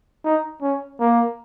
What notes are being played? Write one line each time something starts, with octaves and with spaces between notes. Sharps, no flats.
D#4
C#4
A#3